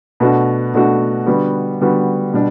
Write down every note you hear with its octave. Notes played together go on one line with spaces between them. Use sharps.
B2 A3 D4 F#4
B2 A3 D4 F#4
D3 G3 B3 F#4
D3 G3 B3 F#4
B2 G3 D4